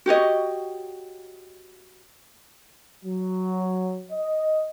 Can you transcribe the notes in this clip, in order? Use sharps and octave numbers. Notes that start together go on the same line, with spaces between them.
F#4 G4 C#5 D#5
F#3
D#5